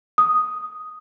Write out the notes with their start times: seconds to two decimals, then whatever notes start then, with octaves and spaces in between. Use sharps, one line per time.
0.18 D#6